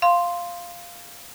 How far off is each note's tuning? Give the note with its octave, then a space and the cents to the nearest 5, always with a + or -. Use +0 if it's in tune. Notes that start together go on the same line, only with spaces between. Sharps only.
F5 +0 C6 +0